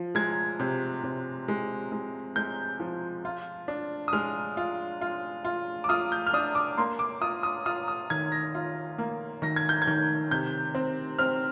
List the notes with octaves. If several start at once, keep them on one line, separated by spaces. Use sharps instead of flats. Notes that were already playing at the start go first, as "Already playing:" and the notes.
Already playing: F3
G#3 G#6
C3
C3
G#3
G#3
G#3 G6
F3
F4
D4
D#6
G#3 F6
F4
F4
F4
D6
F4 D#6
G6
F6
D4 D#6
D6
A#3 C6
D6
F4 D#6
D#6
F4 D#6
D#6
D#3 G#6
A#6
F4
A#3
D#3 A#6
G#6
G6
G#6
D#3
C3 G6
C4
C4 F6